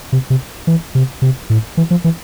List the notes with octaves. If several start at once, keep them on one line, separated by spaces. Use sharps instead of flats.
C3
C3
E3
C3
C3
A2
E3
F3
E3